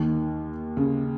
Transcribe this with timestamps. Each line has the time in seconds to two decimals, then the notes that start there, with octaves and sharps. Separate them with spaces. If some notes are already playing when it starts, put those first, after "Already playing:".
Already playing: D#2 D#3
0.77 C#3